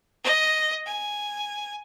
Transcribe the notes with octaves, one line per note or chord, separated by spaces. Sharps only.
D#5
G#5